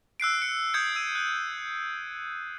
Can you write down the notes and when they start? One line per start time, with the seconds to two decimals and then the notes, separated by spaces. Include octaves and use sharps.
0.20 E6 F#6 C7 D7
0.42 C#7
0.74 D#6 E6 G6 G#6 C#7
0.96 E6 D#7
1.15 F#6